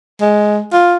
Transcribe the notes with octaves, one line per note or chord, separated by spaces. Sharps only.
G#3
F4